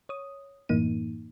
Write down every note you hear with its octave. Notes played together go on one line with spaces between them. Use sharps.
C#5 D#6
F#2 A2 E3 A#3 D#4 D#7